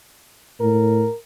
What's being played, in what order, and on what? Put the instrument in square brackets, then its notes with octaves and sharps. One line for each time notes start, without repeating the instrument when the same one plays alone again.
[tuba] A2 [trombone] A#4